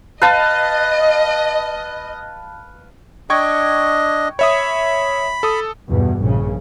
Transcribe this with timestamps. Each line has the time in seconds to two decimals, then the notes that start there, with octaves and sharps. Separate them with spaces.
0.22 B4 D#5 F5 A5
3.30 D4 D#5 G5 C#6 G#6
4.39 C#5 E5 B5 D#6
5.43 A4 D#6
5.89 E2 G2 B2
6.21 A#1 C#3